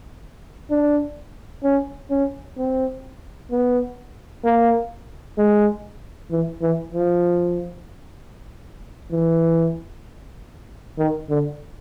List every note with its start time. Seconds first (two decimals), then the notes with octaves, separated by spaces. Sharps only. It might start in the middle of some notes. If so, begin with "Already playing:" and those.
0.70 D4
1.63 C#4
2.10 C#4
2.58 C4
3.51 B3
4.44 A#3
5.38 G#3
6.31 E3
6.62 E3
6.93 F3
9.11 E3
10.98 D#3
11.29 D3